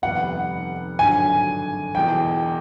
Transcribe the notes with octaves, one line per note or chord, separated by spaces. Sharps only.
F1 D#2 D#3 G3 B3 F#5
G#1 G2 D3 F#3 G#5
E1 E2 B2 G5